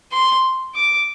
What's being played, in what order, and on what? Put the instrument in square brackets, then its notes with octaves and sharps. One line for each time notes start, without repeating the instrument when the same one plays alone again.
[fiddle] C6
D6